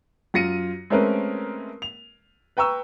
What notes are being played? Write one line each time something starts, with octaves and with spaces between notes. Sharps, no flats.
F#2 F4 A#6 C#7 D#7
G#3 A3 C4 C#4 A#4 B4
F7
B4 G5 A#5 C#6 E6